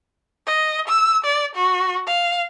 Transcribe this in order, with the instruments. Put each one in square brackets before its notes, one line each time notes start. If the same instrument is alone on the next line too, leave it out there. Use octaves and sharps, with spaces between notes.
[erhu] D#5
E6
D5
F#4
F5